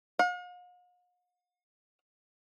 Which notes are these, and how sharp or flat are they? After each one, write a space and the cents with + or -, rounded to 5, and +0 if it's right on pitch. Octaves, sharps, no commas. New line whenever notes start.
F5 +45